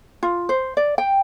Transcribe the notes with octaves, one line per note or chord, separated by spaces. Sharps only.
F4
C5
D5
G5